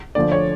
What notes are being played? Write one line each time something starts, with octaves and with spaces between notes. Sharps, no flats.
D2 D3 F3 D5
C#5